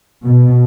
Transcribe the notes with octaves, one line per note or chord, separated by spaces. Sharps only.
B2